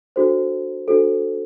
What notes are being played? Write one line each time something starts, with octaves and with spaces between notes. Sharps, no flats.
D4 F#4 A4 C5
D4 F#4 A4 C5